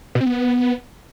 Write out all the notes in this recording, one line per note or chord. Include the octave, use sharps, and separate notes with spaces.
B2
C4
B3